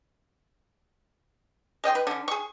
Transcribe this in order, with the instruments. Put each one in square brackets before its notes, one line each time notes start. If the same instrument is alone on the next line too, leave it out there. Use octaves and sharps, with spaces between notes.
[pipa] G#3 D#5 G5 C6
B4
D3 C#4
G#4 C#6